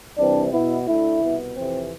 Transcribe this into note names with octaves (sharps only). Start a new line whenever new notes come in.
C2 C3 E3 G3 C4 D4
B2 B3 E4
D2 D3 A3 E4
C2 B2 B3
F2 C3 E3 C4